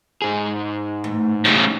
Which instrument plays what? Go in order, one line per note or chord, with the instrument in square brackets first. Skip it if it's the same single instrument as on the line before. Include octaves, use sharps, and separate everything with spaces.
[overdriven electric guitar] G#2 G#4
[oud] E2 A2
[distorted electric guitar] A2 C#3 [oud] C#4 D#4 G4